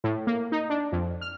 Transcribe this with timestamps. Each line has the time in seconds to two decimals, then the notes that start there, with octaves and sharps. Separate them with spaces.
0.04 A2
0.27 A#3
0.52 D#4
0.70 D4
0.92 F2
1.21 F6